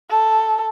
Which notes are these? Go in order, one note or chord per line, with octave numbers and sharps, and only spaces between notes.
A4